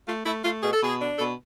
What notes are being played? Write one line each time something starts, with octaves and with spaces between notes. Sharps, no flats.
A3 F4
A3 E4
A3 F4
B2 G#4
A4
B2 G#4
D4
B2 A4